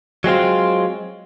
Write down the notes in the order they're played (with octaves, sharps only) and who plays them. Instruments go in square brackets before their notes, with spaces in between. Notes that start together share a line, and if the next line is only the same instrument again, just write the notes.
[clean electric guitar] F#3 G#3 C4 F4